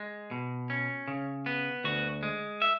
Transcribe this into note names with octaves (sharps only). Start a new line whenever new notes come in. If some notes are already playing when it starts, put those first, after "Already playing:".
Already playing: G#3
B2
C#4
C#3
B3
D2 F#4
G#3
E5